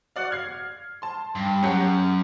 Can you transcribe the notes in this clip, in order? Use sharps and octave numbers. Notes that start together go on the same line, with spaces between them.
F#4 D5 F5
F6 G#6 C7
A5 C6
G2
F#2 C#4 G4 F#5